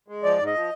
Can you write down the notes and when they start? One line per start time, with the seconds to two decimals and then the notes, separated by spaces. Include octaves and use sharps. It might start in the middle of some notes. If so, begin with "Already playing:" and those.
0.08 G#3
0.23 F3 D5
0.39 G#2
0.47 D#5
0.54 F3